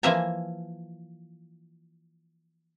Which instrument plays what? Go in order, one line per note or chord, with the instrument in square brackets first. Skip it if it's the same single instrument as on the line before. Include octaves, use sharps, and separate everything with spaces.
[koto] E3 F3 A#3 E5 G#5 A#5